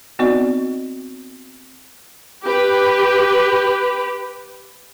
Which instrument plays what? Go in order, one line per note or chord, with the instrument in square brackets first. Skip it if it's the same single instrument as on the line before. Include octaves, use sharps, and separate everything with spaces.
[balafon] B3 C4 D#4 F#4 D5 D#5
[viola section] G4 B4